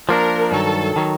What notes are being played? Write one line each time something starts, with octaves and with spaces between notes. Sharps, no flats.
F3 A#3 D4 A#4
G2 D#3 F#3 A4
D#3 F#3